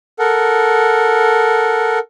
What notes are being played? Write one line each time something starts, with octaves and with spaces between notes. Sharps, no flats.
A4 A#4 F#5